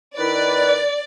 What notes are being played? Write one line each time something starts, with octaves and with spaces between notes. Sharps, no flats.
D#3 E4 B4 D5